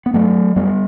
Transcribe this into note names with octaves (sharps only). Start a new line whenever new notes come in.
B3
G2 F#3 A3
F#2 G3 B3